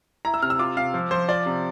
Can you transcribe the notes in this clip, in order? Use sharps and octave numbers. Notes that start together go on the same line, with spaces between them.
E4 A#5
E6
C3 F6
E6
F4 D6
C3 F5
F3
F3 C5
F4 D5
C3